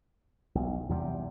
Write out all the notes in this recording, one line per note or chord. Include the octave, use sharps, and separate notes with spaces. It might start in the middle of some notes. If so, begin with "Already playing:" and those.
B1
E2 C3 G3